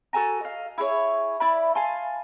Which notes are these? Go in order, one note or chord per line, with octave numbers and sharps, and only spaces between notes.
F#4 A4 G#5 A#5
D#5 F5
E4 G#4 C#5
E4 D5 B5
F5 G#5 A5 C6